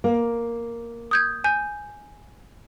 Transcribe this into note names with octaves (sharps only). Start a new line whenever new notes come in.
A#3
D#6 G6 G#6
G#5 G6